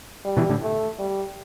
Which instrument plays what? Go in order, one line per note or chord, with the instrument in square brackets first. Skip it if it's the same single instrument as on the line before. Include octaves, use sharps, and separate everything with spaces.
[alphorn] G3
[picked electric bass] B2 E3
A2 D3
[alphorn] A3
G3